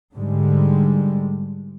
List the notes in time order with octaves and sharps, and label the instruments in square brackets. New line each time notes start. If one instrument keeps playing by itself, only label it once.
[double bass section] G#2 D3 G3 G#3